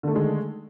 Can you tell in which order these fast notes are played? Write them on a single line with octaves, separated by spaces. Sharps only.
D3 A3 D#3 G#3